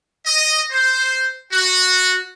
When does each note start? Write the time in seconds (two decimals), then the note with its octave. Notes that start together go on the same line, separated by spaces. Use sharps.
0.25 D#5
0.71 C5
1.51 F#4